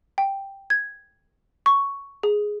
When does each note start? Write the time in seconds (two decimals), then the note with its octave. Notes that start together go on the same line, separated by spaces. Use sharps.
0.18 G5
0.70 G#6
1.66 C#6
2.23 G#4